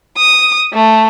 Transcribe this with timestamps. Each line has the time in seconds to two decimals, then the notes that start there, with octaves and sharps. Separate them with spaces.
0.18 D#6
0.73 A3